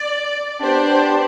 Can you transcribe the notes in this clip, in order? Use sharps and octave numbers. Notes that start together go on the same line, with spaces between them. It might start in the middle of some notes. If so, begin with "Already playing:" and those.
Already playing: D5
B3 D4 G4 C5